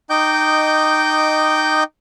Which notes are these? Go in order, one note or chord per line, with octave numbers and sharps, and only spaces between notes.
D#4 D#5 G5 D6 G6